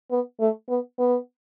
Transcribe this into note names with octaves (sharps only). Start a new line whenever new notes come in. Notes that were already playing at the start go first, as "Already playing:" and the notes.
B3
A3
B3
B3